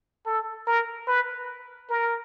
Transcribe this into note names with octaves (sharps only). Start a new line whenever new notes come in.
A4
A#4
B4
A#4